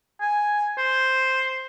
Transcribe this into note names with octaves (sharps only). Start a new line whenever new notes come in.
G#5
C5